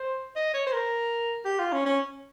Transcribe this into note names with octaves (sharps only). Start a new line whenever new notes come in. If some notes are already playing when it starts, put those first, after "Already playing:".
Already playing: C5
D#5
C#5
C5
A#4
G4
F4
C#4
C#4